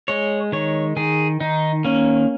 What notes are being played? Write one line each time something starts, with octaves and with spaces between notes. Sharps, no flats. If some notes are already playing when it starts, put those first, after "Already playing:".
G#3 C#5
D#3 C#5
D#3 G#4
D#3 D#4
A#3 C#4